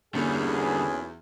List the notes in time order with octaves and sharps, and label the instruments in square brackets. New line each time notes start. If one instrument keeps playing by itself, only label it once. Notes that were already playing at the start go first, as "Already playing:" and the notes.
[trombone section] B1 G#4 [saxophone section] E2 [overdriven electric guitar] D3 G3 [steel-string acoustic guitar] A#3 C#4 A#4